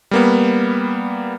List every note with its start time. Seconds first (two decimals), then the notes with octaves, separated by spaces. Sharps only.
0.11 G3 A#3 B3